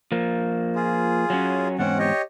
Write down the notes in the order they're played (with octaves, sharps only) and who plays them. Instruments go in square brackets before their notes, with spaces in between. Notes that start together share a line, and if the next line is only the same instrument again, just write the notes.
[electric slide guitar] F3 A#3
[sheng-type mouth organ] F4 G#4
[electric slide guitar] F#3 C#4
[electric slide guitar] E2 G#2 C4 [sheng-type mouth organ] C#4 F#5
[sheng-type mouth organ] G4 C#5 D#5